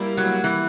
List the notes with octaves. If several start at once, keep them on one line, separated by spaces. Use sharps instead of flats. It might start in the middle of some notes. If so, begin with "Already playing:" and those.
Already playing: G3 A#3 E4
F#3
E3